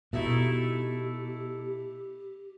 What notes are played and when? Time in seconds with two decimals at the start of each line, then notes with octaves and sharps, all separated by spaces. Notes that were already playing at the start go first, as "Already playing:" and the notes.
0.13 B2 A3 D#4 E4 G4